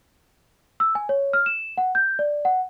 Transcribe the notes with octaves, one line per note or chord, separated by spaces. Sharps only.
E6
G#5
C#5
F6
E7
F#5
G6
D5
F#5